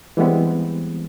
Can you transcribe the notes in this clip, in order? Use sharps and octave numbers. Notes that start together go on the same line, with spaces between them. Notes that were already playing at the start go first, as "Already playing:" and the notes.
E3 G3 G#3 B3 C4